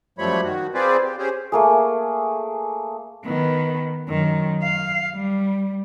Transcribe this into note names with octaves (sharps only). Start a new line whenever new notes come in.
F#2 F3 G3 A3 C#5 B5
D#3 F#4
C4 F4 G#4 B4 C5 D5
G4
C#4 G4 G#4 C5
A3 A#3 G#4
D#3 B3
F#2 D#3
F5
G3